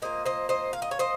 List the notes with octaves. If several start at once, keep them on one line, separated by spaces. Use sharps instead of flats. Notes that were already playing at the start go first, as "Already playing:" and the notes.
A#2 F3 A#3 C5 D#5
C5 D#5
C5 D#5
F5
D#5
C#5
C5 D#5